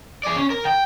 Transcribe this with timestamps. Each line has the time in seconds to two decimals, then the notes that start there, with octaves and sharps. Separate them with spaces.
0.24 G#4 D5
0.36 C#4
0.50 A#4
0.65 G5